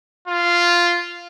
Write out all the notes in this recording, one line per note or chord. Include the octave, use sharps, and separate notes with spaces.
F4